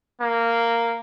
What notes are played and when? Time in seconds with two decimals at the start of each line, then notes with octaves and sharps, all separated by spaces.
0.21 A#3